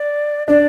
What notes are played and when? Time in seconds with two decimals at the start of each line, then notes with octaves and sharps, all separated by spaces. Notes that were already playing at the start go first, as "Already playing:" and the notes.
Already playing: D5
0.47 D4 D5